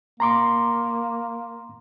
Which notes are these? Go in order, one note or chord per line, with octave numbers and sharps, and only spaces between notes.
A#3 A#5 C6 D6